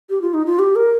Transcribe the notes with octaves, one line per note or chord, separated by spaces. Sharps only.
G4
F4
D#4
F4
G4
A#4